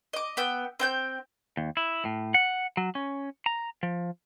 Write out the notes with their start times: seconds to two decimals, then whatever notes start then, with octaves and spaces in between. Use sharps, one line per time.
0.13 D#5 D6
0.37 B3 G5 E6
0.80 C4 G5 G6
1.57 D#2
1.77 E4
2.05 A2
2.34 F#5
2.77 F#3
2.95 C#4
3.46 A#5
3.83 F3